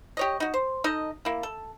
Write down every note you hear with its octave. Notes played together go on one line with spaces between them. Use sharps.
G4 C#5 D#5
D#4 F#4
C5
D#4 A4 D#5
A#3 E4
A4